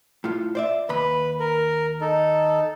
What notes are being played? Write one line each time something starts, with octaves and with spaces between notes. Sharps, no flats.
A2 F4
C5 D5 E5
D#2 B4 B5
A#4
D#4 A4